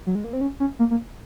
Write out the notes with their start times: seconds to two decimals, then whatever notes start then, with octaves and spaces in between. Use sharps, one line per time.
0.06 F#3
0.15 G#3
0.24 A#3
0.33 C4
0.41 C#4
0.60 C#4
0.79 A#3
0.91 A#3